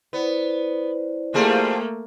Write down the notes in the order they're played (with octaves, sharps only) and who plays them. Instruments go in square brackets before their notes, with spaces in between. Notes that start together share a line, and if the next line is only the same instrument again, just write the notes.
[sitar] B3 [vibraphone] E4 C5 D5
[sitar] F3 G3 G#4 [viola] A3 A#3